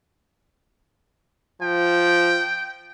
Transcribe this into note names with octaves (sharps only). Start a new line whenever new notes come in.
F3 G5